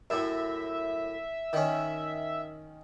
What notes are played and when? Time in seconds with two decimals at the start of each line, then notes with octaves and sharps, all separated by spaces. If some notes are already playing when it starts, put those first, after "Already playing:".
0.10 F#2 A2 E5
1.53 D#3 C#4